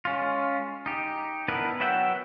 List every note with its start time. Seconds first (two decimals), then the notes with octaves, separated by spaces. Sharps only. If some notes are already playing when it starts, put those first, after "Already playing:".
0.05 G#3 C#4 F4
0.86 D#4 G4
1.48 B3 D4 E4 A#4 B4
1.80 F#3 B3 E5 F#5 G5